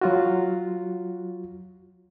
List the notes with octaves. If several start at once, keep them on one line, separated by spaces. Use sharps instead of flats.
F#3 F4 F#4